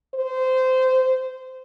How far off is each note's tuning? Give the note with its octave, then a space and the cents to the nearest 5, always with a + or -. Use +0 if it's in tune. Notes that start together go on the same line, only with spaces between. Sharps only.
C5 -15